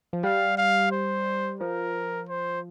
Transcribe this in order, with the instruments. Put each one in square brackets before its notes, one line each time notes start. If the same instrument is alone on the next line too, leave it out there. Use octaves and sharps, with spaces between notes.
[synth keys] F3
[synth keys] G3 [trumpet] F5
[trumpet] F5
C5
[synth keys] F3 [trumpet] A#4
[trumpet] C5